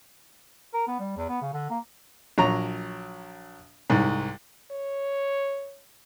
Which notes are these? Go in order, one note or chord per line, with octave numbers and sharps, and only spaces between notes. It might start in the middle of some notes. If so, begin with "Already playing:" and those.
A#4
B3
G3
E2
B3
C#3
D3
A#3
A#1 F#3 C#5 A#5
C2 G#2
C#5